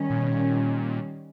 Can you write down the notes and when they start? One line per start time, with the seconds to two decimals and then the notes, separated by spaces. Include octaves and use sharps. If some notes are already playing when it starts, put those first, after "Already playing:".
Already playing: D#3 G3 C#4
0.10 A#2
0.20 B2
0.29 A#2